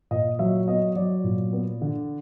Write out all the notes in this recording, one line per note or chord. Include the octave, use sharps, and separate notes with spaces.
A#2 D#5
F#3 E5
B3 D#5
F#3 D5
A#2
B3
D3